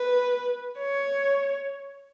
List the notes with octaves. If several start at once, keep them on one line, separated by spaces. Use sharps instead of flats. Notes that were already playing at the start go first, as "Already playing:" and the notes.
Already playing: B4
C#5